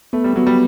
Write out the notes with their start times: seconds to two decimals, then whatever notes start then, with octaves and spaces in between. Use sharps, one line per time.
0.13 A3 B3
0.24 G3
0.36 F#3 B3
0.47 G3